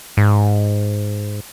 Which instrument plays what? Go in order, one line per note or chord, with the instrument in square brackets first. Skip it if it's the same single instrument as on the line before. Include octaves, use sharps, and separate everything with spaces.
[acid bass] G#2